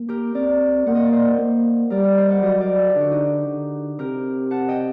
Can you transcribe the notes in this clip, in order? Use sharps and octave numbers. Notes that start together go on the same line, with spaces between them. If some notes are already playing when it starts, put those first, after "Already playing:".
Already playing: A#3
G4 A#4
C4 A#4 D5
A#3 F#5
D#5
D5
C5 D#5
A#3
G3 A#4 D5
G4 A#4
C5 D#5
D5 F#5
F#3 C5 D#5
A#4 D5
A4
G4
D3 F#4
D#4 G4
D3
C3 G4 A#4
F#5 A5
D#5 G5